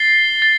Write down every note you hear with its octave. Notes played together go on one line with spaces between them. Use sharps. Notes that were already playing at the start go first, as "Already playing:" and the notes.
Already playing: A6 C7 G7
A6